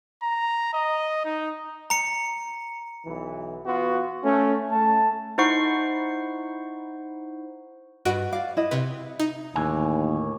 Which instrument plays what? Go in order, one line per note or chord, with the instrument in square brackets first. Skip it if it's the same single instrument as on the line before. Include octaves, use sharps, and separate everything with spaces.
[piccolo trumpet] A#5
D#5
D#4
[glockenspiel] A#5 C#7
[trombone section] B1 E3
B3 F4 F#4
[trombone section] A3 [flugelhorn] C#4
[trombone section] A3 [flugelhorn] A5
[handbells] D#4 E4 C5 F#5 C#6 C7
[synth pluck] G2 F#4 D7 [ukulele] B4 D#5 F#5
[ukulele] D5 F5 [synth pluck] D6
[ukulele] E4 D#5
[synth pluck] C3 B4
D#4
[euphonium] D#2 [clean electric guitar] A2 D3 G#5